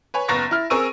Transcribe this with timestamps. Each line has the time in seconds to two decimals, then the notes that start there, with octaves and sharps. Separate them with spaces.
0.14 B4 C#5 G#5
0.28 F#1 B3 A#5 C#6 A6 A#6
0.51 E4 F6
0.70 C4 G#4 A#4 C#6 E6 D#7